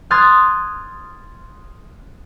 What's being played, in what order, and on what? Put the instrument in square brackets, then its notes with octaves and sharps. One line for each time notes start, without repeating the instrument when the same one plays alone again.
[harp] C6 D#6 F6 F#6 G#6 A6